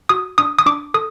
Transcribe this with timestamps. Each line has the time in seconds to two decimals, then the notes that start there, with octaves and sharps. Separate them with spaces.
0.09 F#4 D#6
0.38 D4 D#6
0.59 D#6
0.66 D4 D6
0.94 A4 D#6